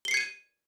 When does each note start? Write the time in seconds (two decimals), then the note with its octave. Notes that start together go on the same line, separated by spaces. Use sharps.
0.05 G7
0.08 C7
0.11 C#7
0.14 G#6
0.17 D#7